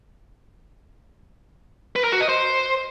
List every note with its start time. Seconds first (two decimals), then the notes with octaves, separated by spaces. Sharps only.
1.96 B4
2.04 A#4
2.12 F#4
2.21 D#5
2.29 C5